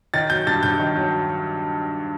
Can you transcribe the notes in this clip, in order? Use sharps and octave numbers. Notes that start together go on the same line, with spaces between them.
D#3 A6
F#3 G6
G2 A6
G2 G6
D#3
F#3